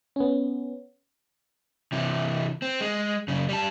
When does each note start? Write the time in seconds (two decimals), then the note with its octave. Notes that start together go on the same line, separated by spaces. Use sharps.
0.16 B3 C#4
1.92 C3 E3
2.62 C4
2.80 G#3
3.28 F#2 C#3
3.49 G3 A5